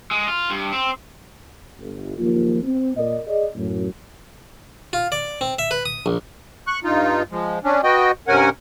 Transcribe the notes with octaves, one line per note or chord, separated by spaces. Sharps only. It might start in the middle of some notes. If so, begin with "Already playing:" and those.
G#3
F4
G2
C4
G1
F#1 D#2 F3 A#3 F4
C4
A#2 A#4 D5 D#5
G#4 D5 D#5
F#2 A2
F4
D5
C4
E5
B4
D#6
A#1
C#6 F#6
G2 D#4 F4
F3 G#3
C#4 D4
B3 F#4 D#5 G5
G2 C3 C#4 A#4 F#5 G#5